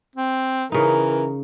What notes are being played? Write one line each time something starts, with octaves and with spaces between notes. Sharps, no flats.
C4
C#3 E3 D#4 A#4